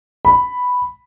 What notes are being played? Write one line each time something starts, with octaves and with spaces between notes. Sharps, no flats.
B5